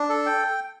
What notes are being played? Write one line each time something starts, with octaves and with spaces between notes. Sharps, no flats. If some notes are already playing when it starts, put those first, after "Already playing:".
Already playing: D4
A4
G5